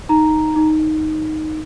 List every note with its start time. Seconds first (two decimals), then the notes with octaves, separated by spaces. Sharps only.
0.09 D#4 A#5
0.56 D#4